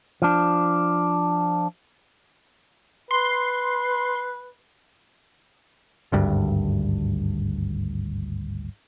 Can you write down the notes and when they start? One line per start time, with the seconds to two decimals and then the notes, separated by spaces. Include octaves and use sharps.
0.22 F3 D4
3.11 B4 C6
6.12 G#1 D2 G2